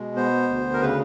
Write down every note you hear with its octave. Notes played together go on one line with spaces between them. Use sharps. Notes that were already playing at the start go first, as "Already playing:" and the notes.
Already playing: B2 G#3
B3 C5
D2
A#4
C#3 B4